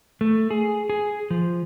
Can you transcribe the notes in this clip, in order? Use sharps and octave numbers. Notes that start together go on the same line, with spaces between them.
A3
G#4
G#4
F3